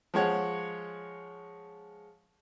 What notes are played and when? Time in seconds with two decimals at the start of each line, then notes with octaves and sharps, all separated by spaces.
0.14 F3 G#3 C#5 F#5